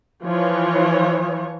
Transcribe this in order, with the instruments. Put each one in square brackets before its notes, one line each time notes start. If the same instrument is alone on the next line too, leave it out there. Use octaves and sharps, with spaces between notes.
[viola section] E3 F3 C#5